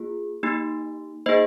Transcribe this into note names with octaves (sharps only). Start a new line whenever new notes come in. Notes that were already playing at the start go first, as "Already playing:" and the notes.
Already playing: A#3 F4 G#4
A#3 D#4 G4
A#3 D#4 G#4 C5 D#5